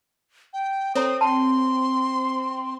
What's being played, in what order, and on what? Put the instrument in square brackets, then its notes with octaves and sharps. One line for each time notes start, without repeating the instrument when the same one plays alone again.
[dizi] G5
[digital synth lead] C4 [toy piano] A4 C#5 A#5 [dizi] D#6
[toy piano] G5 A5 [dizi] C6